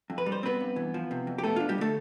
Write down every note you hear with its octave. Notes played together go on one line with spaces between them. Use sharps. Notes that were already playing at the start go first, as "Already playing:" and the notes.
F2
B4
G3
C5
B3 C4 B4
G2
E3
F3
C3
F2
G4
A3 B3 A4
D4 F4
G3 G4
D3 A3 A4